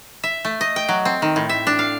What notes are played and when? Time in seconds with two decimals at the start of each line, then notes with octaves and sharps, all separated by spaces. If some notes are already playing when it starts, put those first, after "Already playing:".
0.23 E5
0.45 A3
0.61 D#5
0.76 G5
0.89 F#3
1.05 C4
1.22 D#3
1.36 A2
1.49 E5
1.67 D4
1.79 F5